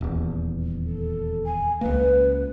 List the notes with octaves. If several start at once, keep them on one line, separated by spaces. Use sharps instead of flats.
D#1 E2
A4
G#5
C#2 A#3 B4